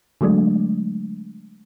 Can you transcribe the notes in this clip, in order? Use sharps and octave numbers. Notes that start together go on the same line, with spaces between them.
D3 F#3 G#3 A3 D4